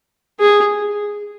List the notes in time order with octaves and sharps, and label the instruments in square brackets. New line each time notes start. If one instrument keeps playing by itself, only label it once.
[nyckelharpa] G#4